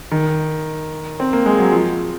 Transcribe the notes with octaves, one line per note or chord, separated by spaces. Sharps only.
D#3
C4
A#3
G#3
F#3
F3